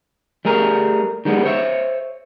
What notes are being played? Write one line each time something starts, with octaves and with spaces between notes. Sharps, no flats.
G3 A3 G#4 A#4
D#3 G3 G#3 B3
C5 C#5 E5